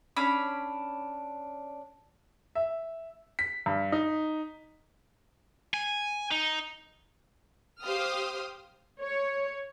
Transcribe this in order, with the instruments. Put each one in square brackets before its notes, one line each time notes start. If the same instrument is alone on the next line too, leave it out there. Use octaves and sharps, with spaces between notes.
[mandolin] C#4 D4 B5
[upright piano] E5
B6
G2
D#4
[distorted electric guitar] G#5
D#4
[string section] G4 C5 F5 G5 D#6 F6
[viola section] C#5